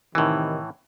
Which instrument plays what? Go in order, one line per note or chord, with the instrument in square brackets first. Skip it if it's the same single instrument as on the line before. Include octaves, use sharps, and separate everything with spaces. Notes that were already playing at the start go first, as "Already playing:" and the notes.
[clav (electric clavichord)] A2 E3 [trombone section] C3 D#3